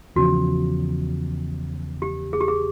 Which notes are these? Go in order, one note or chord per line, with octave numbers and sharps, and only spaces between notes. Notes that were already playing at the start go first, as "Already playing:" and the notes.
E2 C#3 F3 F#4
G4
G#4
G4
G#4